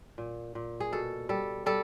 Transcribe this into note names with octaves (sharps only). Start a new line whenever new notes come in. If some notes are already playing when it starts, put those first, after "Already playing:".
A#2
A#2
G#4
B2 A4
G3 A4
G3 A4